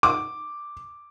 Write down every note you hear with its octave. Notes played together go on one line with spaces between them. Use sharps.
D6